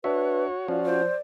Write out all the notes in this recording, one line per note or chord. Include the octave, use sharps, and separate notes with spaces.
D4 F#4 B4 C#5 E5
F3 C#4 F4 F#4 D5
C5